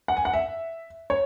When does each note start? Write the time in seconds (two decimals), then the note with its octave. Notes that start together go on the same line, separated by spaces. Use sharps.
0.08 F#5
0.17 G#5
0.25 F#5
0.34 E5
1.10 C#5